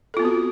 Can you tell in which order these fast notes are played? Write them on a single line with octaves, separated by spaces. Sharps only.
A4 F4 B3 C4 F#4